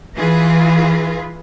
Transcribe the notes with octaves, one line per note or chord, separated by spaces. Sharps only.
E3 F4 G#4 B4